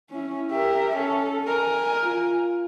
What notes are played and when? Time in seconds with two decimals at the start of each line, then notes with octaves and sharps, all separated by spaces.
0.10 C#4 E4
0.51 G4 A#4 E5
0.96 C#4 A4
1.47 A#4 G#5
2.05 F4